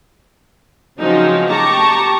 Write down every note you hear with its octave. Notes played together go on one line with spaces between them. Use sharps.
C#3 F3 F#3 G#3 C4 D#4
G4 A5 A#5 C#6 D6